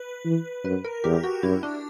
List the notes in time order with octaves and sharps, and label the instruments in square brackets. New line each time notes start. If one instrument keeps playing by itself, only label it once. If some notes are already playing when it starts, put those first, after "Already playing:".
Already playing: [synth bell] B4
[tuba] E3
[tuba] F#2 [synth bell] B4
[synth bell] A#4
[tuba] E2 [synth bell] G4
[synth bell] F#4
[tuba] F#2 [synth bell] E4
[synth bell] D4